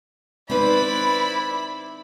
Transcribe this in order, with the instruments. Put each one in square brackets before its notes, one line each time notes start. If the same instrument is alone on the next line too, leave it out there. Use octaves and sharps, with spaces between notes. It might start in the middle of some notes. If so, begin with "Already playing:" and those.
[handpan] G#3 C4 D#4 [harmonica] E4 D5 [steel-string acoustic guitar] B4 C5 [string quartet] B5